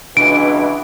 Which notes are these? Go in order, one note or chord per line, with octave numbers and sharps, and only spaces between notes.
C#2 B2 E3 D4 D7